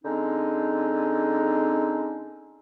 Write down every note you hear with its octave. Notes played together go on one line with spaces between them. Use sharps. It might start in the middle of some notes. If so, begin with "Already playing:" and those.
D3 G#3 C4 C#4 D#4